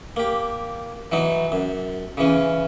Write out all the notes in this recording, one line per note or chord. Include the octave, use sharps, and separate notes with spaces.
A#3 G4
E3 F#3 D#4
F#2
C#3 E3 C#4